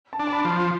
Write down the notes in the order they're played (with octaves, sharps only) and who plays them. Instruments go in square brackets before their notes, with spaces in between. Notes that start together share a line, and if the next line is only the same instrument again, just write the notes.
[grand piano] A5
[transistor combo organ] D4
[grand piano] A5
B5
[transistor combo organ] F3
[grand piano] C6